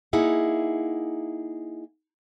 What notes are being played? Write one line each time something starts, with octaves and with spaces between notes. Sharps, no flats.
A#3 D#4 E4 G#4 F#5